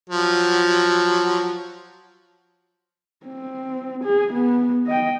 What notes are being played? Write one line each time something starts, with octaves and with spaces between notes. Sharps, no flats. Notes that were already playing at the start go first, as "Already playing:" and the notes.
F3 F#3
C4
G#4
B3
D#5 G5